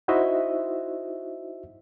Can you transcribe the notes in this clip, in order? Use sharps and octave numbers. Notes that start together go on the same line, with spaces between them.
D#4 E4 F#4 C5 D#5 E5